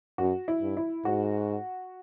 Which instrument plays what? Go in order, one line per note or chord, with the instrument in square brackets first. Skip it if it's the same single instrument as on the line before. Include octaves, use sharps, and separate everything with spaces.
[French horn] F#2 [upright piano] F#4
[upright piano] E4
[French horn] G2
[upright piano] E4
[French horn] G#2 [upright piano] F#4